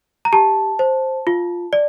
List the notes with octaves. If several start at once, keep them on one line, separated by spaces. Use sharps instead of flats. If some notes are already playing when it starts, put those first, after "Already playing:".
A#5
G4 A5
C5
F4
D5